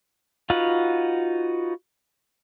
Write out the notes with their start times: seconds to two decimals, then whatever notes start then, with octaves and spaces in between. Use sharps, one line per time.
0.50 D#4 F4 F#4 B4 F#5